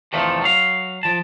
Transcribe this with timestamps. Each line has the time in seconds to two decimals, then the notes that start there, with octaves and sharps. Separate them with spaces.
0.13 E2 C3 D#3 F3 A3
0.42 F#3 F5
1.03 F3 A5